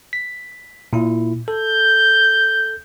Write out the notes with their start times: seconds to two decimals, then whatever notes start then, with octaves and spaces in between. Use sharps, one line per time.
0.13 B6
0.93 A#2 E4
1.48 A4 G6